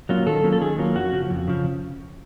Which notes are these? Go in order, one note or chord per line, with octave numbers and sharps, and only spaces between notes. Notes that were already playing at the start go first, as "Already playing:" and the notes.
F#3 A#3 C#4 F4
D#3 A4
F#3 A#3 C#4 F4
A4
D#3 G#4
F#3 A#3 C#4 F4
F2 F#4
C#3 F3
F2
C#3 F3